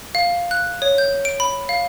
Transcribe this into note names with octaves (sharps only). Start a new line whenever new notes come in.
F5
F#6
C#5
G6
D7
B5
F5